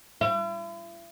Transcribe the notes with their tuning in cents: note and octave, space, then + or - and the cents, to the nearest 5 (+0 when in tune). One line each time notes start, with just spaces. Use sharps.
E4 +45